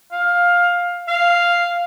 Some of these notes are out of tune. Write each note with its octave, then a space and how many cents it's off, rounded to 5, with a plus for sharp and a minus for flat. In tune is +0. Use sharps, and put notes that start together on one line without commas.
F5 +15
F5 +0